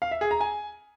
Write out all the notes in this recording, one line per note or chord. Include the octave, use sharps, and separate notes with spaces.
F5
E5
G#4
A#5
G#5